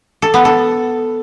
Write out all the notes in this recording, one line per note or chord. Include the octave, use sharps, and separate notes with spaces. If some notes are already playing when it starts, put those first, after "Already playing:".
A4
B3
A4